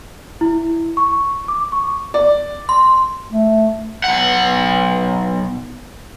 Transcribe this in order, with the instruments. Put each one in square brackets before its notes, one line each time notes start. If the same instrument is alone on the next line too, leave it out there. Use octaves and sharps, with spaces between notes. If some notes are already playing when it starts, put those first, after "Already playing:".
[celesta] E4
C#6
D6
C#6
[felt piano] D5
[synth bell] C6
[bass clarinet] A3
[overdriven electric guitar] B1 F#5